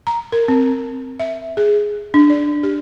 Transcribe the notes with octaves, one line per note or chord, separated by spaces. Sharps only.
A#5
A#4
C4
E5
G#4
D4
D5
G4